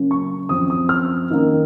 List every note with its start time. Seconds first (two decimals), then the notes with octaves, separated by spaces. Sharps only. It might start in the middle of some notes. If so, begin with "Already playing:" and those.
Already playing: C#3 F#3 A#3 C#4
0.11 C#6
0.49 F#2 F3 C4 D#6
0.70 D#6
0.89 F6
1.29 F#2 D#3 A#3